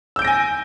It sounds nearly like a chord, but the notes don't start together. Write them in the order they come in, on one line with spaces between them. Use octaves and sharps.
E6 G6 D7 A#6 G#5